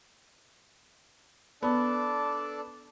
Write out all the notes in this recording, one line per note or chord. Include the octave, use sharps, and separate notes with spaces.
B3 D4 A4 D5